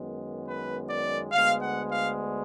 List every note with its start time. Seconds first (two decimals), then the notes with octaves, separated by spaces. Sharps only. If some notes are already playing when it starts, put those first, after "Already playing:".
Already playing: F#2 D#3 G#3 B3
0.46 B4
0.89 D5
1.32 D2 D3 G#3 B3 F5
1.60 F#5
1.89 F5